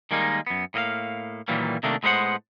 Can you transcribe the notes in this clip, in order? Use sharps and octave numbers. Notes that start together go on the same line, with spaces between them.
D#3 G3 G#3 A#3 D#4
F#2 B3
A2 A#3 D#5 F5
A#2 D#3 E3 F#3 G3 A#3
C3 D#3 A3 A#3 D4
A2 G#3 B3 A#4 C5 F#5